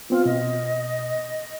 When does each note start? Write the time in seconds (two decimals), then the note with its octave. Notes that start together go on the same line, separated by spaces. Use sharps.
0.10 B3 C4 F4
0.26 B2 D#5